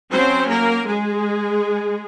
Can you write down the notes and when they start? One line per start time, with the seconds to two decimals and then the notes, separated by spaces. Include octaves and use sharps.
0.11 F#3 C4 C#4 C5
0.49 A#3 A#4
0.87 G#3 G#4